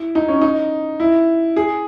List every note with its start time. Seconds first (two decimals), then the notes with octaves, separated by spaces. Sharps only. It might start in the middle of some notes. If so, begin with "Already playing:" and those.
Already playing: E4
0.15 D#4
0.28 C#4
0.42 D#4
1.00 E4
1.56 G#4